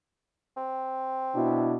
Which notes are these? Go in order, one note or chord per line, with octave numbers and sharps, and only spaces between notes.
C4
B2 D4 E4